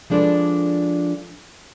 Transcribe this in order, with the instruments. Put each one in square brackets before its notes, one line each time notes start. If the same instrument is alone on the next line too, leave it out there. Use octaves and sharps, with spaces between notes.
[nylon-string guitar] F3 G#3 D4 A4 B4 D5